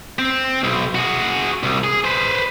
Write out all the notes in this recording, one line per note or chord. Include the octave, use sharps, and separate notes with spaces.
C4
B1
F#4 G#4
C2
G#4
B4 C5